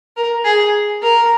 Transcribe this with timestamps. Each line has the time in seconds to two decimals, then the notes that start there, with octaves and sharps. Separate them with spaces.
0.16 A#4
0.44 G#4
1.02 A#4